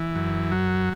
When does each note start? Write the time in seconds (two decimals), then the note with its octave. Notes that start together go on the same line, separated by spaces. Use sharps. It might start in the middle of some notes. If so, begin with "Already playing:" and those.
Already playing: E3
0.16 F#2
0.52 F#3